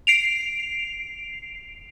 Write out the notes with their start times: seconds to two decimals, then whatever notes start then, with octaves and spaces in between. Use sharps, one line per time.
0.07 C7 D7 F7